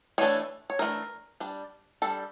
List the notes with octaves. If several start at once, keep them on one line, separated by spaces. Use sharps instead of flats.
E3 A3 D4 C#5
C#5
E3 A3 D4 A#4
G3 D4
G3 D4 A4